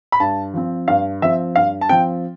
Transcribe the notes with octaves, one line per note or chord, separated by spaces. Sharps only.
B5
G2 A5
F3 C4
G2 F5
F3 C4 E5
G2 F5
A5
F3 C4 G5